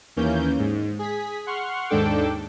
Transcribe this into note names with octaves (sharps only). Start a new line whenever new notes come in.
D#2 E3 A#3 C#4 G6
G#2
G#4 B6
F#5 C6 C#6 F6
D#2 G#2 D4 A4 G5 D6